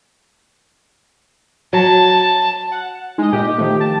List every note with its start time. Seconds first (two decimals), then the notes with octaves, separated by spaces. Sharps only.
1.73 F#3 A5
2.72 F#5
3.18 G#3 D#4 D#5
3.33 A#2 G4 D#5
3.58 D#3 F3 A3
3.81 A5